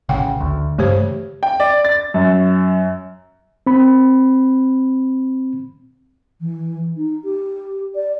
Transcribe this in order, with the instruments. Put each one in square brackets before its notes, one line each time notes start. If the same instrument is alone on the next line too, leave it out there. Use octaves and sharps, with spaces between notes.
[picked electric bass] A1 C#3 [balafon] F#5 G5
[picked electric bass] D2
[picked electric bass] G2 C#3 A3 [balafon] E3 G4 C5
[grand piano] G5
D5
A6
F#2
[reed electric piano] C4 B5
[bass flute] E3
D#4
G4
D5